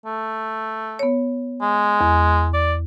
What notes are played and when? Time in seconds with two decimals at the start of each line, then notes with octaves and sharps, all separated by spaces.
0.06 A3
0.99 B3 C#5
1.62 G#3
2.01 E2
2.54 D5